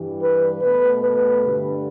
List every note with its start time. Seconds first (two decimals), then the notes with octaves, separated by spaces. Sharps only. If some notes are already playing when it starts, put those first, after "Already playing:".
Already playing: G2 E3 G3
0.21 B4
0.61 B2 A3 B4
1.02 B4
1.42 G2 D3 G3